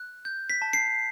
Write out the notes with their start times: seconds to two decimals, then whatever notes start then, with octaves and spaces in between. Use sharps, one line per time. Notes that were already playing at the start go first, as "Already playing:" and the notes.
Already playing: F#6
0.25 G6
0.50 B6
0.62 A5
0.73 C7